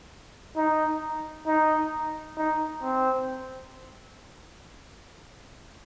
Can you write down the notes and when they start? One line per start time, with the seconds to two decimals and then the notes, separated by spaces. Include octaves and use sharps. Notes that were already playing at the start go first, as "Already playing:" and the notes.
0.57 D#4
1.47 D#4
2.38 D#4
2.83 C4